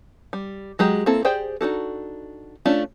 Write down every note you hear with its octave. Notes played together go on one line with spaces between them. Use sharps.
G3
F#3 G#3 G4 A#5
A#3 C4 E4 A4
G4 G#4 C5 D5 G5
D4 D#4 F#4 A4
A3 C#4 D4 F4